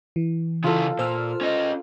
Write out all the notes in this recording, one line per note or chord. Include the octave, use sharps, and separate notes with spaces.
E3
C#3 E4 F4 A4
A#2 C5 E6 F6
C#4 D#5